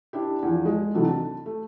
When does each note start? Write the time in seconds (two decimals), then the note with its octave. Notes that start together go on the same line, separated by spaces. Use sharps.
0.13 D4 E4 G4
0.43 E2 F3
0.65 G#3
0.94 C3 D#3 E3 F#3 A3 D4
1.09 A5
1.46 A3